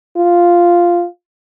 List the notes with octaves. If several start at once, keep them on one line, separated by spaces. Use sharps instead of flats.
F4